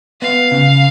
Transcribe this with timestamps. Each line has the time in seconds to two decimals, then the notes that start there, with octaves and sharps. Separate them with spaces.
0.21 B3 F5
0.51 C#3